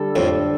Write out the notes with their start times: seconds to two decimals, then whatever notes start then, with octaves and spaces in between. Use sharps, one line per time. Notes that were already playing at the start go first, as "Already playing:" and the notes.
Already playing: D3 G3 D4 A4
0.16 F2 A2